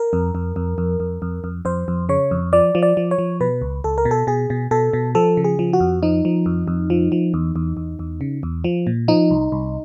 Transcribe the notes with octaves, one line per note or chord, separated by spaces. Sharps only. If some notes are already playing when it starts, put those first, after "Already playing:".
Already playing: A#4
F2
F2
F2
F2
F2
F2
F2
F2 C5
F2
C#3 C#5
F2
F3 D5
F3
D5
F3
C#5
F3
B2 B4
C#2
C#2 A4
A#4
B2
A4
B2 G#4
B2
B2 A4
B2
F3 A4
C#3
G#4
F3
F#4
F2
F3 D#4
F3
F2
F2
F3
F3
E2
E2
E2
E2
C#3
E2
F3
A#2
F3 D#4
C2
C2